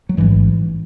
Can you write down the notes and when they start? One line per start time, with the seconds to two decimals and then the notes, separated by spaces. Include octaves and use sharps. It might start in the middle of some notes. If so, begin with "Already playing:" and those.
0.09 F#3
0.17 A1 G#2 E3